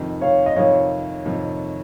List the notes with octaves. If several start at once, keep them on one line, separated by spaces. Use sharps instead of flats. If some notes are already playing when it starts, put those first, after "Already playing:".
Already playing: F2 C3 D#3
C#5 F5
D#5
F2 C3 D#3 C#5 F5
F2 C3 D#3